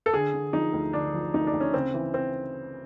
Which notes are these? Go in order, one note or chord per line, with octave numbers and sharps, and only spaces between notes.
A4
D3 G#4
D3
F3 D#4
D2
D3 D4
F3
D2 D#4
D4
D2
C#4
C#3 C4
E3
C4